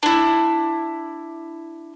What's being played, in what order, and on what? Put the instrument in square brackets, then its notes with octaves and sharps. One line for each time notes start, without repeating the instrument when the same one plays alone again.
[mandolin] D4 E4